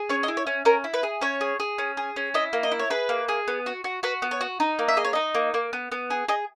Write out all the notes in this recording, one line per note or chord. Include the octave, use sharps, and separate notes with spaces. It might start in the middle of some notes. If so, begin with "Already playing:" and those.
Already playing: G#4
C#4 C#5
D#5
E4
C#5
C#4
C#4 A#4
E4
B4
G#4
C#4 C#5
G#4
G#4
C#4
G#4
C#4
E4 D#5
A#3
D#5
E4
C#5
G#4 B4
A#3
G#4
B3
F#4
F#4
F#4 B4
B3
C#5
F#4
D#4
A#3
E5
G#4 D#5
C#5
D#4 D#5
A#3
A#3
B3
B3
G#4
G#4 D#5